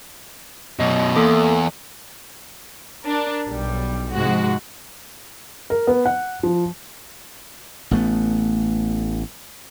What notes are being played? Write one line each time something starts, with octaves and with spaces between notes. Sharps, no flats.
F#2 B2 D#5
E2 A#3 A4 D6
D4 A#4
B1 G3
G#2 C3 F3 G#3 F#4
A#4
B3
F#5
F3
A1 A3 B3